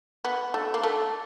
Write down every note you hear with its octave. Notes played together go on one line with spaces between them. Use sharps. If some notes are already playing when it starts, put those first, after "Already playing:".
B3
A3
A#3
A3